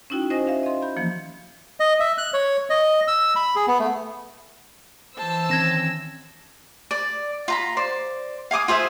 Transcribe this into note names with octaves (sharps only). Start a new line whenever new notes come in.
C#4 D#4 E4 F#4 G5
C#4 C5 D#5 G#5 D#6 A#6
E5 F5
D#5 C6
B5 G6
E3 F3 A#3
D#5
E5
F#6
C#5
D#5
E6
B5
G#4
B3
A3
E3 C5 A5 E6
D#3 C4 C#4 G#6 A#6 E7
D5
F4 A#5 B5
C5 D5
F5 G#5 D6 D#6
F4 G#4 C5 E5